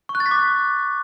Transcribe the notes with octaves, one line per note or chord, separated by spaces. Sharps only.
C#6
F#6
A6
B6
D6